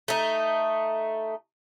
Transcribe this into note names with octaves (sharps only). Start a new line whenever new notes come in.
A3 D#4